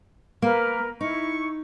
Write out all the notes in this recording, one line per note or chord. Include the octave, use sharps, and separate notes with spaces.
A#3 A#4 B4
D#4 E4 C#6